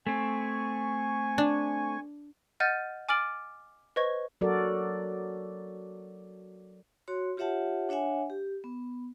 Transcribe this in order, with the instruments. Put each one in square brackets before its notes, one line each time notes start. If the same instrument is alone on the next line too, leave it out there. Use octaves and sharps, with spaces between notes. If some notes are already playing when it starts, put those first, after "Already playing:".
[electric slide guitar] A3 C4 [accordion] G#5 C#6
[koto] D4
[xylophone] D#5 F#5 F6 G6 A6 D#7
G#5 D6 F6 A6 D7 F#7
B4 C5 D#5 C#6 G#6
[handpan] F#3 F#4 A4 A#4 D5
[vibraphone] F#4 C#5 C6
F4 G4 C#5 E5 F#5 A5
D4 C#5 E5 F#5 G#5
G4
B3